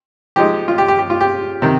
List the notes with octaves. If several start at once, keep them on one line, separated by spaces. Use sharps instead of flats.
F3 G#3 D#4 G4
F4
G4
G4
G4
F4
G4
C3 D#3